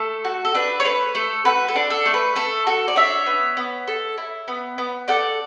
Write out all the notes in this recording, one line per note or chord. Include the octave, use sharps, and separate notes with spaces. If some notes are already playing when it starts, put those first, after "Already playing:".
Already playing: A3 A4
F#4
A4
D4 B4
C#5
A3 B4
A3 A4
F#4 B4
A4
D4
A4
A3
B4
A3 A4
F#4 A4
D5
D4 C#5 E5
B3
B3
A4
E4
B3
B3
A4 D5 F#5